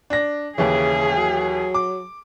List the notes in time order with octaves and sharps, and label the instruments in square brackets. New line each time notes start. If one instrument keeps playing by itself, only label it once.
[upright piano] D4 A#6
[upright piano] D#2 E3 [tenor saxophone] C#3 [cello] G#4
[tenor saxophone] F#3
[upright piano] D6